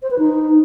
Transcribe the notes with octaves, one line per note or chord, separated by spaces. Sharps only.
C5
B4
D#4